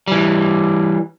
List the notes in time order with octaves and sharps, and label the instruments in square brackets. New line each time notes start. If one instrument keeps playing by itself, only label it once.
[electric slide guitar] E3 G3